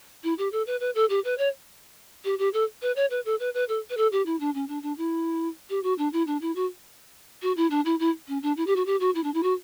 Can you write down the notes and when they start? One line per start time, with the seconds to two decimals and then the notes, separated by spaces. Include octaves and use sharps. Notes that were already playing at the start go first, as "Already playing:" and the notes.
0.24 E4
0.38 G4
0.52 A4
0.67 B4
0.80 B4
0.95 A4
1.10 G4
1.24 B4
1.38 C#5
2.25 G4
2.39 G4
2.53 A4
2.82 B4
2.96 C#5
3.10 B4
3.25 A4
3.40 B4
3.54 B4
3.69 A4
3.90 B4
3.97 A4
4.12 G4
4.26 E4
4.40 D4
4.55 C#4
4.68 D4
4.83 D4
4.98 E4
5.70 G4
5.83 F#4
5.98 D4
6.13 E4
6.27 D4
6.41 E4
6.56 F#4
7.42 F#4
7.57 E4
7.70 D4
7.85 E4
8.00 E4
8.28 C#4
8.43 D4
8.57 E4
8.67 G4
8.76 F#4
8.86 G4
9.00 F#4
9.15 E4
9.24 D4
9.34 E4
9.43 F#4